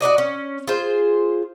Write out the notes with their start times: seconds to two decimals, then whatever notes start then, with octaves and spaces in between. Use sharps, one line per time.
0.01 F#4 A#4 D5 D#5
0.18 C#4
0.68 F4 G#4 C5